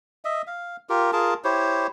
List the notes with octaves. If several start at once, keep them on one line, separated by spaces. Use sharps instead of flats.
D#5 E5
F5
F4 G4 A#4
F4 G#4 A#4 A5
E4 G4 C5 C#5